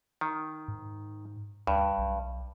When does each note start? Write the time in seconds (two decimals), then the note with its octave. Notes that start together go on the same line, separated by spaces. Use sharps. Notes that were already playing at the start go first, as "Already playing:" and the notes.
0.21 D#3
0.68 G#2
1.67 D2 G2
1.98 B1